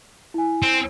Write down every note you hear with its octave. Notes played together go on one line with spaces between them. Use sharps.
E4 G#5
C4